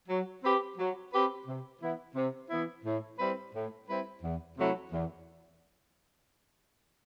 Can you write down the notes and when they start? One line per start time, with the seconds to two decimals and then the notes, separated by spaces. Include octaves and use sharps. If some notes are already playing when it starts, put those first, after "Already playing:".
0.08 F#3
0.42 C4 G4 B4
0.78 F#3
1.12 C4 G4 B4
1.47 C3
1.81 E3 B3 E4
2.15 C3
2.50 E3 B3 E4
2.84 A2
3.19 G3 C4 E4 B4
3.54 A2
3.88 G3 C4 E4 B4
4.23 E2
4.57 C3 F#3 A3 E4
4.91 E2